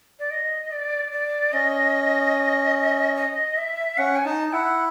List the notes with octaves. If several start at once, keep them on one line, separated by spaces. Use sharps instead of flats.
D5
D#5
D5
D5
C#4 D#5
D#5
E5
C#4 F#5
G#5
D#4 A5
E4 F#5